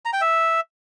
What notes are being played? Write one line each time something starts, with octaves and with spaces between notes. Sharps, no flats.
A#5
G5
E5